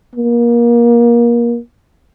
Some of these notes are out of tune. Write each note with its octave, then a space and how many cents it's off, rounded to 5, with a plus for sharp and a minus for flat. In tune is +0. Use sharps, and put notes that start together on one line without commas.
A#3 +25